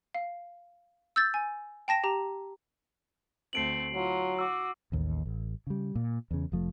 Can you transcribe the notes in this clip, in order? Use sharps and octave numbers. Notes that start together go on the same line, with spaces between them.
F5
E6 G6 A6
G#5
G5 A5 A#6 E7
G4 A#5
D2 A3 C4 C7 D7 F#7
F#3 E4 F4
F#4 D6 E6
A1 D#2
A1
C#3 G3
A#2
E2 C#3
F1 F3 A3